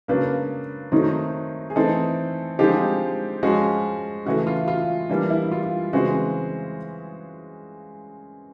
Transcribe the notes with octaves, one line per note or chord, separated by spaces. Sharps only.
C#3 F#3 A#3 D4 B4
D#3 F#3 A3 C4 D#4
G#4
E3 A3 C4 D#4 A4
D3 F3 G#3 C4 D#4 G4
F3 G#3 C#4 F#4
C#3 E3 A3 F#4
F4
F4
E3 G3 A#3 D4
E4
F4
C#3 E3 G#3 C4 F#4